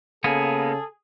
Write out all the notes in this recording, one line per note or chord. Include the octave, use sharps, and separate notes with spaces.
C#3 A#3 B3 G#4 A4